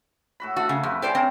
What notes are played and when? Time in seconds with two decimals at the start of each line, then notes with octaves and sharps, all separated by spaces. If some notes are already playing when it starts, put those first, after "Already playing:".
0.40 A2 F#4 B5
0.57 F#4 E5 F#5 A5
0.69 C#3
0.83 F2 G4 B4
1.02 C#3 C#4 G4 C5 D5
1.15 C4 A#4 C#5